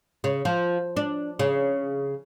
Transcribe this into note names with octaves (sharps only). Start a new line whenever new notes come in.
C#3
F3
D4
C#3